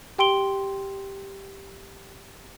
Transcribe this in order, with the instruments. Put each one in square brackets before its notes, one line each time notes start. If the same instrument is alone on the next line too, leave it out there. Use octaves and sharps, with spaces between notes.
[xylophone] G4 G5 C6 D7 G7